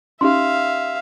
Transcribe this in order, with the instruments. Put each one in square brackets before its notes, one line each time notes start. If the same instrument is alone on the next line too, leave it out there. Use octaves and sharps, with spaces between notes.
[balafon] C#4 D#4 [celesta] G4 C6 [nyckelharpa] E5 F5